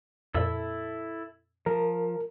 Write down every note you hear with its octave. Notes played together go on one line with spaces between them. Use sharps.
F2 A#2 E4 A4 E6
F3 A#4